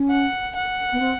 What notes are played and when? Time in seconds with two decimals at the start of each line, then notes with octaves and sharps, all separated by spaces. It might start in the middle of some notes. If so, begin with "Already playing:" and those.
Already playing: C#4
0.10 F#5
0.55 F#5
0.92 B3
0.99 C4